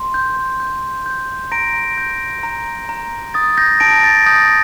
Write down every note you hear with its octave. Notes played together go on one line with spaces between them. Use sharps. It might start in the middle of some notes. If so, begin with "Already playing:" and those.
Already playing: C6
G6
G6
G6
A#5 A#6 D7
G6
A#5
A#5
D#6 A6
G6 A#6
A5 A#6 D7
A6
D#6 G6 A#6